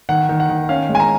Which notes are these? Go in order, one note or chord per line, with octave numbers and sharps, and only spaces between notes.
D#3 F#5
D#3
F#5
D#3
C#4 F5
G#3
G#5
A#5